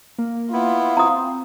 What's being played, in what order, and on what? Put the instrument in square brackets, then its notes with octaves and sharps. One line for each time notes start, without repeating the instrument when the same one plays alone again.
[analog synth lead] A#3
[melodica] B3 E4 [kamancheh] F4
[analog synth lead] C4 [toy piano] A#5 D#6